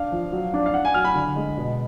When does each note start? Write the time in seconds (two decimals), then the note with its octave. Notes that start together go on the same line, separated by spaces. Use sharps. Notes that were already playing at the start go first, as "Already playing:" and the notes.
Already playing: D4 F5
0.12 F3
0.32 F#3
0.54 D4
0.66 F5
0.74 D4 F#5
0.85 G#5
0.94 F#3 F6
1.04 B5
1.15 D3
1.36 G#3
1.57 B2